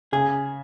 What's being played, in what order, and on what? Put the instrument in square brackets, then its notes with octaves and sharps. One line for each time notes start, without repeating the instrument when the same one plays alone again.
[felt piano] C#3 [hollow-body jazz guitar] G#4